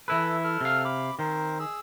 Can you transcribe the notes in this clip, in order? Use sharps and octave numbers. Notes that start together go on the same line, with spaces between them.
E3 E4 A4 B4
A4 F6
C3 F5
B5 D6
D#3 C4 A#4 C5
G#4 E6